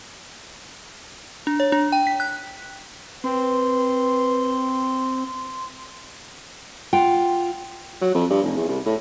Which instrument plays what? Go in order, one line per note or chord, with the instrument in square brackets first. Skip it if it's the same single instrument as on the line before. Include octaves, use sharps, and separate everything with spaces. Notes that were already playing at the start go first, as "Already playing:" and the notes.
[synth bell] D4
C#5
D4
G5
B6
F#6
[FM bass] C4 [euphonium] B4 [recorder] C6
[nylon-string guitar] F4 F#5 G5
[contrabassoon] F#3
F2
G2
F1
E2
C2
A2